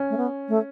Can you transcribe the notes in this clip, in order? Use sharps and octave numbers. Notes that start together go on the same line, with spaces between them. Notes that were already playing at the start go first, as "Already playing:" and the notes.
Already playing: C#4
A3
B3
A3